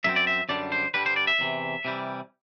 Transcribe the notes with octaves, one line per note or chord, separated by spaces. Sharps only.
F#2 F#3 C4 E5
D5
E5
F#2 D3 G3 D4 D5
C5
G2 D3 G3 B4
C5
D5
E5
E2 C3 E3
C3 E3 G3